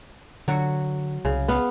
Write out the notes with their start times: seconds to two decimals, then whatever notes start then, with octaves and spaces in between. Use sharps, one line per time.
0.48 D3 F#3 F#4
1.25 C2 C#3
1.48 B3 F5